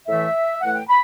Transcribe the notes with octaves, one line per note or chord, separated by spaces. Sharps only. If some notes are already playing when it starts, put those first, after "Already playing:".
A2 E3 A3 E5
A2 E3 A3 F#5
G5
B5